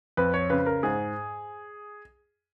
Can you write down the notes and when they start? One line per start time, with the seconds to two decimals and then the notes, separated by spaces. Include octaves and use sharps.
0.17 F2 B4
0.34 C#5
0.50 C#3 B4
0.66 A#4
0.83 G#2 G#4